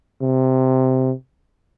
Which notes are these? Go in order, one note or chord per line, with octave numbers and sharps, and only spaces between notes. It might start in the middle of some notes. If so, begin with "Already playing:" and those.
C3